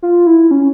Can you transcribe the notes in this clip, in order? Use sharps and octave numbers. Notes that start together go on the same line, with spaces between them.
F4
E4
C#4